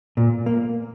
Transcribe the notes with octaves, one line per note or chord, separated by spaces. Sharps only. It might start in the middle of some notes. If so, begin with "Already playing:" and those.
A#2
A#3